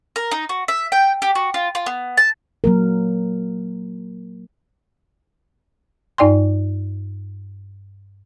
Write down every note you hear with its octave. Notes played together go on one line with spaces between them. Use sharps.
A#4
D#4
F#4
E5
G5
G4
F#4
F4
F4
B3
A5
F#3 A#3 A#4
G2 D#4 D5 G5 C6